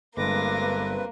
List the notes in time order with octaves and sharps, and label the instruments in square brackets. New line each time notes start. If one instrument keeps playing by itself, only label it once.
[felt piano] G1 [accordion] G2 C4 B4 [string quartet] G#3 D6 A#6 [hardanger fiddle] A#3